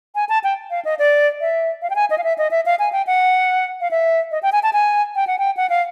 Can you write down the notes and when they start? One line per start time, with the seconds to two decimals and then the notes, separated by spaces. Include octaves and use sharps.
0.15 G#5
0.29 A5
0.44 G5
0.70 F5
0.85 D#5
0.99 D5
1.41 E5
1.82 F5
1.90 G5
1.96 G#5
2.10 D#5
2.18 F5
2.24 E5
2.38 D#5
2.51 E5
2.66 F5
2.79 G#5
2.92 G5
3.07 F#5
3.81 F5
3.91 E5
4.31 D#5
4.43 G5
4.52 G#5
4.63 A5
4.73 G#5
5.15 G5
5.27 F#5
5.39 G5
5.57 F#5
5.70 F5